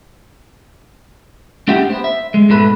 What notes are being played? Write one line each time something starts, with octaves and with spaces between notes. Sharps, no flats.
A3 D4 G4 E5 F#5 G5
B3 C5
E5
G#3
G#2 B2 A3 B4